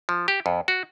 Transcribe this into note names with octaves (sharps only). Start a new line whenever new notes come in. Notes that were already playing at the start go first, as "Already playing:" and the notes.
F3
G4
F2
F#4